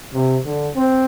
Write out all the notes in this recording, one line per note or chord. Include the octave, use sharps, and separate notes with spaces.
C3
D3
C4